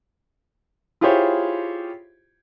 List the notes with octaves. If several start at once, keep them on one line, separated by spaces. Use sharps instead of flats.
E4 F4 G4 G#4 C5 C#5